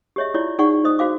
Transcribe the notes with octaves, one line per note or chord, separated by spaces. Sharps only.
G4 G#4 C#5 D#5 E5
E4 F4 G4 C#5 D5
D#4 G#4 D5 F#5 C#6
C5 D#5 D#6
F#4 C5 F5 D6